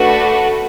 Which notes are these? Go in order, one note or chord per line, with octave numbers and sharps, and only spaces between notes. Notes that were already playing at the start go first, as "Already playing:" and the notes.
Already playing: A3 D4 F#4 B4